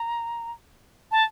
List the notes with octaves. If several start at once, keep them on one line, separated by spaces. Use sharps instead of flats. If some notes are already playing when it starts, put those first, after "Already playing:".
Already playing: A#5
A5